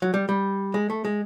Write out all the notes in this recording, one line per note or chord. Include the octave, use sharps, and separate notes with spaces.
F#3
G3
G3
G#3
A3
G#3